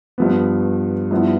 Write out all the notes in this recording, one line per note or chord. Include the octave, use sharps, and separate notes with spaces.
G2 F3 B3
G2 F3 B3 E4